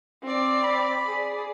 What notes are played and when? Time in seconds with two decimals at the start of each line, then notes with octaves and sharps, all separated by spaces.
0.23 C4 D5
0.64 B5
1.06 G#4 D5